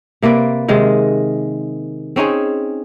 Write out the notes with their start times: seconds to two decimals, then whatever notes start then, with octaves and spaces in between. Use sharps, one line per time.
0.22 C3 A#3 B4 D5
0.68 C3 D#3 G#3
2.16 C4 C#4 D#4 G#4